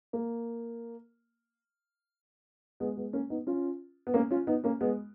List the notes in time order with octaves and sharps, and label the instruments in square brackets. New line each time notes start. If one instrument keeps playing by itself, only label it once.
[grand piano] A#3
G#3 B3
G#3 B3
A#3 C#4
B3 D#4
C#4 F4
B3
A#3 C#4
C#4 F4
B3 D#4
A#3 C#4
G#3 B3